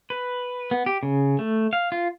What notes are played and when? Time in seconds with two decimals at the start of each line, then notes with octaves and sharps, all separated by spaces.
0.10 B4
0.71 B3
0.86 G4
1.03 C#3
1.39 A3
1.73 F5
1.92 F4